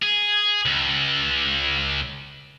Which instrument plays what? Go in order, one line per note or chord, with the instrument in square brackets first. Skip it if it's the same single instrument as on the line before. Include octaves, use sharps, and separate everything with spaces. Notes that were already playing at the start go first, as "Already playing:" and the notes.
[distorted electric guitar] G#4
C#2